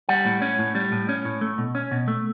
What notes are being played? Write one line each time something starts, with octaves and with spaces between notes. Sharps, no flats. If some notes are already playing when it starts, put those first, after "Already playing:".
G3 F#5
A2
C#4
A2
G3
A2
C#4
A2
A3
B2
C#4
B2
A3